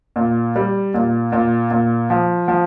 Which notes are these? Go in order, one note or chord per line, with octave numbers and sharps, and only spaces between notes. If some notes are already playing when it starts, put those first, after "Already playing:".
A#2
G3
A#2
A#2
A#2
F3
F3